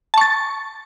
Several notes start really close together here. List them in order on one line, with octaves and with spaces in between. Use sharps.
A5 C#6 A6